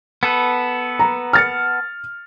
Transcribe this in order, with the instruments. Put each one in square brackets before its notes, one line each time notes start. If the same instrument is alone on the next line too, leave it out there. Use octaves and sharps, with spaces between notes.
[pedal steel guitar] B3 A4 B4
[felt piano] A#5
F6 A6 C#7